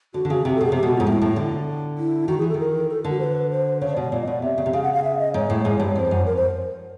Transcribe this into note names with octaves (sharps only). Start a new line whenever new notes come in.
D3 F#4
D3
C#3 F#4
C3 G4
A4
B2 G#4
C3 G4
B2 F#4
G#2 F4
A2 E4
A2
D3
E4
D#3 F#4
E3 G#4
A4
D#3 A#4
A4
D3
F#4
C5
B4
C5
C#3 C#5
D5
B2 C#5
A#2 D5
D#5
B2 D5
C3 E5
C#3
C3
C#3 F5
F#5
F5
E5
D#5
G#2 C#5
A2
G#2
G2
F2 C5 C#5
F#2
F2 A#4
C5